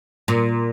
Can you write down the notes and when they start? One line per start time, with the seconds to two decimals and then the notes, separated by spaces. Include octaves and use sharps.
0.28 A#2